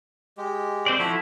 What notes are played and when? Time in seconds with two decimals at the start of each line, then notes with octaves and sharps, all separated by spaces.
0.38 G#3 G4
0.86 C4 C5 D5
0.99 F3 E4 F#4 A4 B5